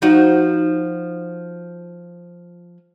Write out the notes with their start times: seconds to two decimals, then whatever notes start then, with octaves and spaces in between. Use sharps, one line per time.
0.02 F3 D#4 F#4